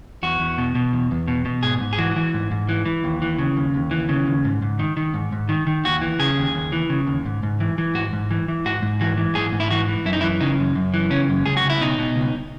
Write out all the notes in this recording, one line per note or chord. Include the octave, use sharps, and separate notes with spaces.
E2 F#4
E2
B2
B2
E2
E2
B2
B2
G#2 G#4
G#2
G#4
E3 F#4
E3
G#2
G#2
E3
E3
D#2
E3
C#3
D#2
D#2
E3
C#3
D#2
G#2
G#2
D#3
D#3
G#2
G#2
D#3
D#3
D#2 F#4
E3
C#3 G#4
D#2
D#2
E3
C#3
D#2
G#2
G#2
E3
E3
G#2 F#4
G#2
E3
E3
G#2 F#4
G#2
E3 F#4
E3
G#2 G#4
G#2
E4
E3 F#4
E3
F#2 E4
D#4
E3 E4
C#3 D#4
F#2
F#2
E3
C#3 C#4
F#2
C#2 G#4
F#4
C#2
E4
B2 D#4
B2
C#2